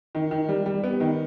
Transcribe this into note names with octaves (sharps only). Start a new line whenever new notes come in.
D#3
D#3
G3
G3
B3
D#3